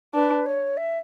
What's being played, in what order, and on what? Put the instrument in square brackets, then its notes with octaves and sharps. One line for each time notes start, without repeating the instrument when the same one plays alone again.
[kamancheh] D4 [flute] B4
[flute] C#5
E5